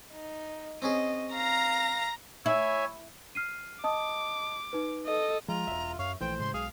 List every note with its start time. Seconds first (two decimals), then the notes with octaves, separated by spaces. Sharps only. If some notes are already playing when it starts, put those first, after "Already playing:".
0.12 D#4
0.82 C4 C#4 G#4 D#5
1.35 F5 A#5 A#6
2.46 E4 C#5 E5 G#5
3.35 F6 C7 D#7
3.84 D#5 A5 D6 D#6
4.73 D#4 B4
5.06 A4 D#5
5.48 F3 G#3 F4 A#5
5.67 E1 B1 E5
5.99 F#2 C#5 F5
6.21 A#1 E3 A3 E4 C5 G5
6.39 A2 C#3 G#3 C6
6.53 B1 G#4 F5